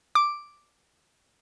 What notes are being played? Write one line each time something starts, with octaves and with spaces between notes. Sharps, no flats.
D6